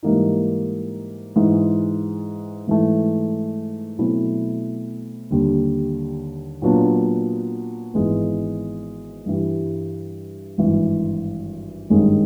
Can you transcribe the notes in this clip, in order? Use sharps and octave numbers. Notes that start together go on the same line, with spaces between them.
G#2 E3 G3 A#3 D#4
G#2 E3 G#3
G#2 E3 A3
B2 F#3 A3 C4 E4
D#2 D3 G3
A#2 F#3 B3 D4 F4
G#1 G#2 E3 G#3 B3
G2 E3 G3
G#1 G2 E3
G#1 G2 D#3 G#3 C#4